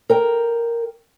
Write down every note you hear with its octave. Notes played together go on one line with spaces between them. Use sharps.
A#4 G5